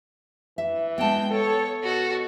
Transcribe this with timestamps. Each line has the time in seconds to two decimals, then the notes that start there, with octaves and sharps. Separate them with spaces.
0.58 E3 E5
0.98 G#3 B3 G5 A5 G6
1.31 A4 C#5
1.85 B2 F#4 A4